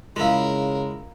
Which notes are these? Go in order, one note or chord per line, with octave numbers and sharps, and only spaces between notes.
C#3 G#3 E4 F4 A#4 F5